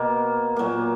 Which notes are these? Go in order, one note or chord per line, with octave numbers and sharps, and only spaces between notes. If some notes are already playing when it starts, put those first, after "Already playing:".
Already playing: B2 A#3
A#2 F#3 A#3